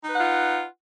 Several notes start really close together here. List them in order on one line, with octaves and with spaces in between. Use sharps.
D#4 B4 F#5 F4